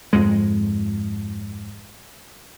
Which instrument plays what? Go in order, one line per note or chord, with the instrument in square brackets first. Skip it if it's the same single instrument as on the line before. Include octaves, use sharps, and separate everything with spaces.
[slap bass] F2 G#2 G#3